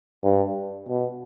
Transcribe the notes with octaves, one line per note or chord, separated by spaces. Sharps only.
G2
B2